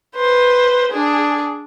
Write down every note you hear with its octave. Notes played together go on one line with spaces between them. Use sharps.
B4 C5
D4 G#4